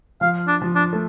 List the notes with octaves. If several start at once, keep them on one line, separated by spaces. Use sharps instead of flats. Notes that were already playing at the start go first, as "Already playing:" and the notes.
F3 F5
D4
F3
D4
A3